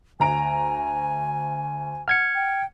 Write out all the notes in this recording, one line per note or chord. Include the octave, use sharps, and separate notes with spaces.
D2 G#5 A#5 D7
F#5 F6 G#6 C#7
G5